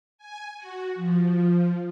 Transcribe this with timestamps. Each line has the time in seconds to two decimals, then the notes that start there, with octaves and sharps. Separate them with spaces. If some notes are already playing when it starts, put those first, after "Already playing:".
0.18 G#5
0.57 F#4
0.94 F3